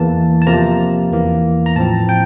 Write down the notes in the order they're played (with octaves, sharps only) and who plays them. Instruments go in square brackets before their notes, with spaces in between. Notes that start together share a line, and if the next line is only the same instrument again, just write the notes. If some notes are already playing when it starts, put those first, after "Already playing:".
Already playing: [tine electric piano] E2 E3 A#3 A5
A5
C3 F3 A#3 A#5
E2 E3 A#3
A#5
A2 F3 C4 A5
G5